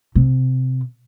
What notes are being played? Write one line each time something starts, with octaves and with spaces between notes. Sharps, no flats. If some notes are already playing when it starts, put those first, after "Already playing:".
C3